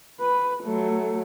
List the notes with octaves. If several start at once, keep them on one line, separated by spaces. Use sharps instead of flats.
B4
F#3 A3